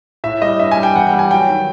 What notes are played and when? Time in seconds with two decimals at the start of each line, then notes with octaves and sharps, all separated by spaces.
0.24 A2 E5
0.42 G3 D#5
0.60 G2 E5
0.71 G#5
0.77 G3
0.83 G5
0.95 E2 F#5
1.07 G5
1.13 G3
1.19 G#5
1.31 F#3 G5
1.49 D#3